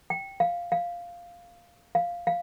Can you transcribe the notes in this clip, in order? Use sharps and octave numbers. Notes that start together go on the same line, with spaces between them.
G5
F5
F5
F5
F5